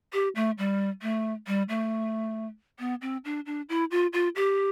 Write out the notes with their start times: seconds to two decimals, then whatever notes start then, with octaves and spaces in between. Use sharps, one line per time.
0.13 G4
0.35 A3
0.58 G3
1.02 A3
1.47 G3
1.69 A3
2.79 B3
3.02 C4
3.25 D4
3.46 D4
3.69 E4
3.91 F4
4.13 F4
4.36 G4